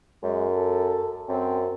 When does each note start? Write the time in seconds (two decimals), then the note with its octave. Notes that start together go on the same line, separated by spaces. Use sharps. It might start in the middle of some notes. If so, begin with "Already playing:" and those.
0.23 F#2 G#3
0.54 A4
1.29 F#2 C4